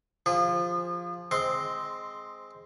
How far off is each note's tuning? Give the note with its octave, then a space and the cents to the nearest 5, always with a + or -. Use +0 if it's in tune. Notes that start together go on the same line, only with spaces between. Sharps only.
F3 +0 G#4 -40
G#3 +0 C4 +0 C6 +0